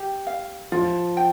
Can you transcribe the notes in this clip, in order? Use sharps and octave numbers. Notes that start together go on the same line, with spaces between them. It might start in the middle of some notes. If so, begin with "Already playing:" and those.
Already playing: G4
F5
F3 F4
G5